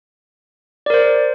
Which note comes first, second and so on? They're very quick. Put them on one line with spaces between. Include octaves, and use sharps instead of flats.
D5 A#4 C5